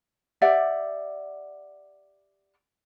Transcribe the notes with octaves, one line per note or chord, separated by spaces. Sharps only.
G4 D5 E5 F#5